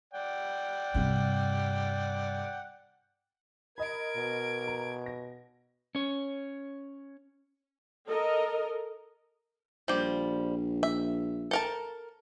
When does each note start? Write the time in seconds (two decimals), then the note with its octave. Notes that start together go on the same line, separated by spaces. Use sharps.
0.13 D5 F#5 G5
0.94 G2 C3
3.78 A#4 D#5 B5 G#6 D7
4.17 B2
4.67 A#5
5.06 A#6
5.95 C#4 C#5
8.08 A4 A#4 D#5
9.88 A#1 F3 G3
10.83 E5
11.51 A4 A#4 A5